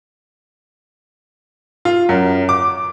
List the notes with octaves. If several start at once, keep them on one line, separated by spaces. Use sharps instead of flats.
F4
F#2
D6